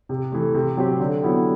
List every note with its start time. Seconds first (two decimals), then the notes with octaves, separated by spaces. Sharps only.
0.09 C3
0.32 E3 A3
0.54 C3
0.77 F#3 C4 G4
1.00 D3
1.22 F#3 B3 E4 G4